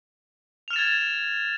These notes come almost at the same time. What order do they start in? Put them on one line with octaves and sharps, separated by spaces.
F7 F6 E7 A6 G#6